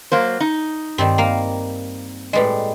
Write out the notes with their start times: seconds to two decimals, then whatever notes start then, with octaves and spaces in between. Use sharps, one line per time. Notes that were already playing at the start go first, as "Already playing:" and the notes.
0.12 F#3 A#3 C5
0.40 D#4
0.98 G2 D#3 G3 C4
1.18 A#3 F5
2.33 A2 G3 G#3 B4 D#5